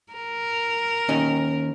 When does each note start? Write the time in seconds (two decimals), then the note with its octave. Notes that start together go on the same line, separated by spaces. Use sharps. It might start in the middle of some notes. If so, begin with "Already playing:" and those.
0.13 A#4
1.09 D#2 C#4 D#4